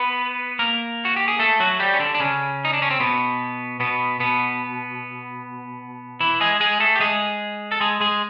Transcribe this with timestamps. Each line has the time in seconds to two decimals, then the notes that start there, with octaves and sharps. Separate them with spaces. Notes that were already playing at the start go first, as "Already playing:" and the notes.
Already playing: B3 B4
0.59 A#3 A#4
1.05 F#4
1.16 G4
1.28 G#4
1.39 A3 A4
1.60 F#3 F#4
1.80 G3 G4
1.94 C#4
1.99 D3 D4
2.15 D4
2.20 C#3 C#4
2.65 D#4
2.73 D4
2.82 C#4
2.91 C4
3.00 B2 B3
3.80 B2 B3
4.20 B2 B3
6.20 E3 E4
6.41 G#3 G#4
6.60 G#3 G#4
6.80 A3 A4
6.96 G4
7.00 G#3 G#4
7.72 A4
7.80 G#3 G#4
8.00 G#3 G#4